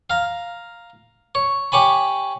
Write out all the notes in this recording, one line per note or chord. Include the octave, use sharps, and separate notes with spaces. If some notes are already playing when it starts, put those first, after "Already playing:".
F5 A#5
C#5
G4 C#5 G#5 B5